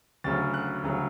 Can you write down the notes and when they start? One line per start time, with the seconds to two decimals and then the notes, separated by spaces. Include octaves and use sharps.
0.24 D2 C#3 F#3 A6
0.54 F#6
0.84 D2 C#3 F#3